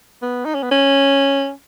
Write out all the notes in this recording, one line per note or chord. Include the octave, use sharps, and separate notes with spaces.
B3
D#4
C#4
B3
C#4